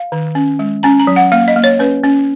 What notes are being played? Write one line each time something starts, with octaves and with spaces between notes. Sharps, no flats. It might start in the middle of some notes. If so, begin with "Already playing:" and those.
Already playing: F5
D#3
C#4
G#3
C#4 A#5
A#5
F#3
F#5
A#3 F5
D#5
A#3
C#5
C#4 B4
C#4